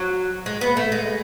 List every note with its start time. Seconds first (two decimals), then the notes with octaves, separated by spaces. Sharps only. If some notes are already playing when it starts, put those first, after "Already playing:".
Already playing: F#3
0.46 G#3
0.61 B3
0.77 A3
0.92 G#3